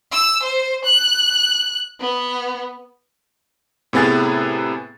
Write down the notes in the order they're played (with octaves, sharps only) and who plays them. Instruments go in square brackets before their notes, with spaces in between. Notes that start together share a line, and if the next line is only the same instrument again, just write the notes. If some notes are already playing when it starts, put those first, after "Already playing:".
[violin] E6
C5
F#6
B3
[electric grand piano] A2 C3 B3 G#4 A6